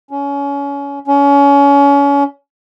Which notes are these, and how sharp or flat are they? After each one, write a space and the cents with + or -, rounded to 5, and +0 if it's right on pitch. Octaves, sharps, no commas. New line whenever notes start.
C#4 +25
C#4 +30